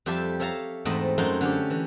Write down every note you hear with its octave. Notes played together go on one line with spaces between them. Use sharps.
F2 G3 G4 A4 E5 A5
A4 C#5 E5 F5 A5 A#5
E2 G#2 A3 C4 D#5 B5
F#2 G#3 A3 D#4 A4 C6
D3 C#4 G4
E3